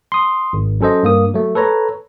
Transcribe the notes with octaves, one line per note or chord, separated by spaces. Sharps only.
C6 D#6
G#1
F#3 C#4 A4 C5 D#5
G2 A#3 D#6
F#3 A3
A4 B4 C#5 A#5